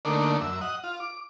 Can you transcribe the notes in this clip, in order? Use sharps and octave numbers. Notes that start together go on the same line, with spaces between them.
D3 A3 A#3 D4 D#4
F#2 E5
D#5 F#5
F4
D6